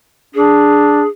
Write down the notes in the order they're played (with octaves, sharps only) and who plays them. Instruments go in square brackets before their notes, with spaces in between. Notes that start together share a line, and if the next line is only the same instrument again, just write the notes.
[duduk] D4 [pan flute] G#4